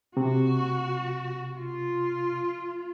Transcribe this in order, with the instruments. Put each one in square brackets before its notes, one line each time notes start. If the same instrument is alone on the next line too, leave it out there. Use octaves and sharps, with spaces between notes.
[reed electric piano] C3 [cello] F#4
[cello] F4